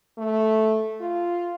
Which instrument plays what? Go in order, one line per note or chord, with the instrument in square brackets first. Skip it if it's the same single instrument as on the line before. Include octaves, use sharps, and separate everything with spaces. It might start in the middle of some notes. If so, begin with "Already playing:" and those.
[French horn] A3
F4